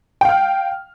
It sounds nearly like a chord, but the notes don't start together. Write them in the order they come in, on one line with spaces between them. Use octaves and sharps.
G5 F5 F6